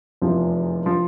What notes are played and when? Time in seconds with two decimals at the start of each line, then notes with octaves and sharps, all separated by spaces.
0.22 F1 E2 C3 F3
0.86 F3